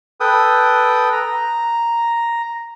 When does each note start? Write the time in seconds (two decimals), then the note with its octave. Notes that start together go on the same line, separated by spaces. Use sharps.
0.20 A4 B4 G5 D#6
1.12 A#5